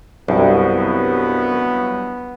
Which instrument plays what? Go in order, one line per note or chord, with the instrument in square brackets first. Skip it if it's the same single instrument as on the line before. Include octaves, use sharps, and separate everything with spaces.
[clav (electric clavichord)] C2 [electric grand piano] G2 F#3 E4 [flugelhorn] B3